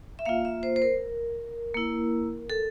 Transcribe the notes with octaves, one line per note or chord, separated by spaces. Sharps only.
E5
A#3 F4 F5
E5
C5
C5
A#4
A#3 E4
A4